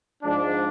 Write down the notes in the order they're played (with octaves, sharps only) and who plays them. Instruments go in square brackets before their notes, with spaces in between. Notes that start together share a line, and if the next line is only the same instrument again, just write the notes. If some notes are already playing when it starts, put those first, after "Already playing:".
[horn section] G#2 F3 G#3 D4